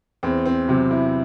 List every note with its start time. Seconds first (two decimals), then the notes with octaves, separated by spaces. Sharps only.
0.23 E2 C4
0.45 C4
0.68 C3 F#3
0.91 E4